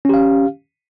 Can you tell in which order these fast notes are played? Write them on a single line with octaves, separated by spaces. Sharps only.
C#4 G4 F5